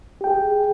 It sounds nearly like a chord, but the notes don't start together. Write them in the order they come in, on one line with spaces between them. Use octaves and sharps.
G4 G5 G#4